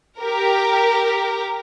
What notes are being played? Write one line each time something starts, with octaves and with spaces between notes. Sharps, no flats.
G4 A#4